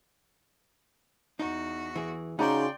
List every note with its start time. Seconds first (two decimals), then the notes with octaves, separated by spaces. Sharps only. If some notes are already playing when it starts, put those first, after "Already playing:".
1.39 E2 D#4 F#4
1.96 E3 G#4
2.39 C#3 C#4 D#4 F#4 D5 G5 A#5 C6